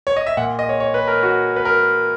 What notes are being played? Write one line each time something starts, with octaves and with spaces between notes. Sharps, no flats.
C#5
D#5
E5
A#2 F#5
D#5
C#5
C#5
B4
A#4
F#4
B4
A#4